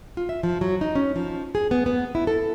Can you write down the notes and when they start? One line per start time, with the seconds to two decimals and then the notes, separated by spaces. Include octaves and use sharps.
0.17 F4
0.29 E5
0.43 F3
0.61 F#3
0.81 D#4
0.95 C#4
1.16 F3
1.55 G#4
1.71 B3
1.86 B3
2.15 E4
2.27 A4